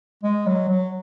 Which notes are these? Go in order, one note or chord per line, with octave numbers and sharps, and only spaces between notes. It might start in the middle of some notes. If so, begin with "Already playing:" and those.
G#3
F#3
F#3